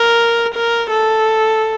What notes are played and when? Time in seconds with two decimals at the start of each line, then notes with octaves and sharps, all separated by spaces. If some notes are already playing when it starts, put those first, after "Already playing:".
Already playing: A#4
0.55 A#4
0.91 A4